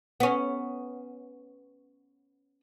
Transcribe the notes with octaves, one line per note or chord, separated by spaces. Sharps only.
B3 C#4